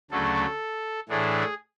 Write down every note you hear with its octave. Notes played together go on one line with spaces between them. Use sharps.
D2 C#3 F#3 A3 C#4 A4
A2 E3 A3 D4 G#4